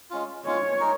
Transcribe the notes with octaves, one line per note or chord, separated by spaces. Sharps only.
G#3 C#4 F4
G#3 C#4 F4 C#5
G#3 D#4 A#4 C#5